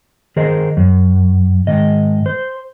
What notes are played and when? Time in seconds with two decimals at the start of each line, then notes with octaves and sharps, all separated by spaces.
0.36 D#3 G#4 A#4 C5 D#5
0.77 F#2
1.67 G#2 D#3 D#5
2.26 C5